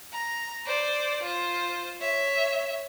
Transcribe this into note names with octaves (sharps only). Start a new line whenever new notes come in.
A#5
C5 D5
F4 C5
C#5 E5